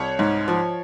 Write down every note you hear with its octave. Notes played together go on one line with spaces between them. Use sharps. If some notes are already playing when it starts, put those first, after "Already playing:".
Already playing: C2 C#5
G#2
F3